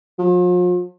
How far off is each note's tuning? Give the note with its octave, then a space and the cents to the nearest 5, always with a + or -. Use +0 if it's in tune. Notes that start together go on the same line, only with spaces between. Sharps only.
F3 +40